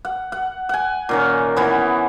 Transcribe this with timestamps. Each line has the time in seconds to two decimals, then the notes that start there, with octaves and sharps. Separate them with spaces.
0.05 F#5
0.32 F#5
0.69 F#5 G#5
1.09 A#2 D#3 C#4
1.56 E3 B3